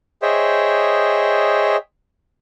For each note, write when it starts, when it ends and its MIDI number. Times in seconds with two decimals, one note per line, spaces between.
0.22 1.77 68
0.22 1.77 72
0.22 1.77 73
0.22 1.77 75
0.22 1.77 76
0.22 1.77 79